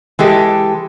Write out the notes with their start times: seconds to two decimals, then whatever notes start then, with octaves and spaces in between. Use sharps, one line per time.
0.19 E3 G#3 G4 A4